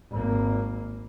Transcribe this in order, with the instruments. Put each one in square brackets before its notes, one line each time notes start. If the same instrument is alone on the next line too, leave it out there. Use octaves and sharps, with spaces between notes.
[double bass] G#1 A#3